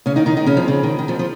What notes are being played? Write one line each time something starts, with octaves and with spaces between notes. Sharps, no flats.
C#3 C#4
D#3 D#4
D#3 D#4
D#3 D#4
C#3 C#4
F2 F3
C#3
D#3
D#3
F2 F3
F3